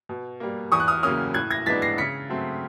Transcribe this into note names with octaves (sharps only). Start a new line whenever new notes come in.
B2
G3 A#3
E2 C#6 D#6
F#6
D#6 F6
C#3 F#3 A#3 C#4 D#6 F6
A2 F#6 G#6
G#6 A#6
E3 G#3 B3 D4 A6 B6
A#6 C7
C#3 B6 C#7
F#3 A3 C4